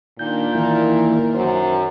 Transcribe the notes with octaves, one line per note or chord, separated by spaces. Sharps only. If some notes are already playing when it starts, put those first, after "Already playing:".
A#2 D#3 D4 G6
D#3 E3 A#3 E4 A#4
F#2 C5